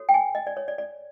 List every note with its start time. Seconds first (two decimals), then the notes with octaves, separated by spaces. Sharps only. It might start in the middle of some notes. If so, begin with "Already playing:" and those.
Already playing: F#4 A4 C#5
0.09 G5
0.14 G#5
0.35 D#5
0.47 D5
0.57 C#5
0.68 D5
0.78 D5